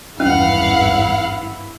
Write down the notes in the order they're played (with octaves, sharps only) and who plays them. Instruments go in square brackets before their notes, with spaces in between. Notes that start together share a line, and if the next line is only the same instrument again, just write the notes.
[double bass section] G#1 E2 G2 [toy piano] C#4 [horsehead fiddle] E4 [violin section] F5 F#5